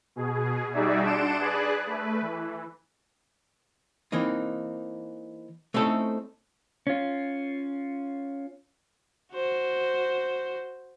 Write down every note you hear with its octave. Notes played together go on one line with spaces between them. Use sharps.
B2 G#4
G3 D#4 F#4 G#4 D5 E5
D4 F#5 A5 C6 D7 E7
G#4 B4 D5 F#6
A3 B4
E3
E3 A#3 C4 D#4
A3 C4 C#4 D#4 E4 A4
C#4 F4
F#4 C5